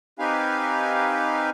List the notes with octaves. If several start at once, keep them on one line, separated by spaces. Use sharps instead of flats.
C4 D#4 G4 B4 F5 G#5